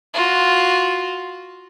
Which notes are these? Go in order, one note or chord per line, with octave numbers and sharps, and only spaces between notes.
F4 F#4